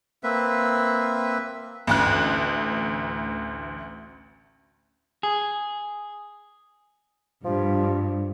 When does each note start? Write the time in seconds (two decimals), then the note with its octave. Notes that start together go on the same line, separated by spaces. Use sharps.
0.24 A#3 C4 B4 E5
1.87 A1 D2 F#6
5.23 G#4
7.45 G2 F3